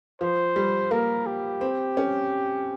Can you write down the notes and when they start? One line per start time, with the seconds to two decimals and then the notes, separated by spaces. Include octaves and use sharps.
0.21 F3 C5
0.56 G3
0.91 A#3 A#4
1.26 G4
1.61 C4
1.97 C#4